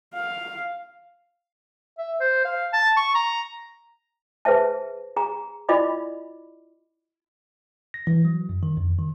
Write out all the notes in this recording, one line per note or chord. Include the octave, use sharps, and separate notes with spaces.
F5
E5
C5
F5
A5
C#6
A#5
G#4 B4 C5 E5 A5
G#4 A#5
E4 F4 D5 D#5 B5 D6
A#6
E3
F#3
F#2
D#3
F2
D#3